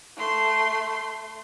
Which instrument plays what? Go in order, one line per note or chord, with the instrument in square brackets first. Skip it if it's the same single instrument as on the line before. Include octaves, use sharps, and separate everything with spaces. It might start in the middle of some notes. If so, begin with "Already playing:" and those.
[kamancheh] A3 C6